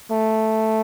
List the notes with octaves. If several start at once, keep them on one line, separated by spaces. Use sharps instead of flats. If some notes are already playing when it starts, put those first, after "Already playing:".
A3